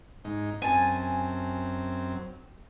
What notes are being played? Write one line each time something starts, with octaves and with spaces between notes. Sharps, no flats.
G#2 D#4
F#2 C4 G#5 A5